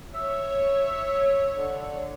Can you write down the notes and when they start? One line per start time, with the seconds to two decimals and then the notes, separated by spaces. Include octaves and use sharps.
0.14 C#5 E5
1.52 D3